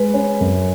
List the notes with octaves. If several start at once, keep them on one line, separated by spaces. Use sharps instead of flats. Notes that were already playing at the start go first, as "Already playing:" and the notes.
Already playing: G#3 B4
C#4
F#2